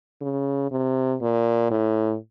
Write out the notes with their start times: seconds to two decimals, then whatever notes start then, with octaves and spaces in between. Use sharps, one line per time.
0.22 C#3
0.71 C3
1.21 A#2
1.71 A2